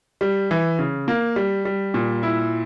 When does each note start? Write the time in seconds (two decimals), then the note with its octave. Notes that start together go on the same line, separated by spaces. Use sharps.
0.21 G3
0.51 E3
0.79 C#3
1.08 A#3
1.36 G3
1.65 G3
1.94 A#2
2.23 E4